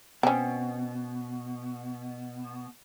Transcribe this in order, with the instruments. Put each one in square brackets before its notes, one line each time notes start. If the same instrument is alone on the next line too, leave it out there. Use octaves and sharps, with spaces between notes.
[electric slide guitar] B2 [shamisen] C4 C#4